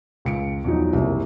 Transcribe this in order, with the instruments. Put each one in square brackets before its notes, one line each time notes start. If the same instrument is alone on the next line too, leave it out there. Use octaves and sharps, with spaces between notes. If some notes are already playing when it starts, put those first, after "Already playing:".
[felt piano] C#2 C#7 D7
E2 F3 F#3 D#4
F#1 C2